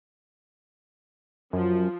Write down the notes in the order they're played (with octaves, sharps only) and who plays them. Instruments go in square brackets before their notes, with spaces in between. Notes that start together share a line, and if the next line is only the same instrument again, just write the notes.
[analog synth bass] F#2 [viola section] F3